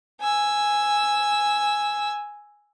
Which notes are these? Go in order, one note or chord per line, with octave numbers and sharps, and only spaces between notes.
G#5 E6